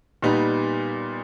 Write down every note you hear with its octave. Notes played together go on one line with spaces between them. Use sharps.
A#2 G3 B3 D#4